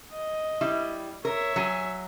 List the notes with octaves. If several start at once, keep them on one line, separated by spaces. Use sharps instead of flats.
D#5
G3 E4
A#4 C#5 E5
F#3 G#5